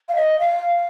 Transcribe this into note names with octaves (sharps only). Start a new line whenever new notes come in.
F5
D#5
F5